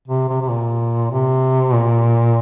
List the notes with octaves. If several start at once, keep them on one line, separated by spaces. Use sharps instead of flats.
C3
C3
C3
A#2
C3
A#2